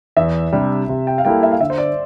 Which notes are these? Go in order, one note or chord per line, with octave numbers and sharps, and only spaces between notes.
E2 E5
C3 G3 D4
C3
G5
F5
G3 A#3 E4 A4 G5
E5
F5
D3 E5
C5
D5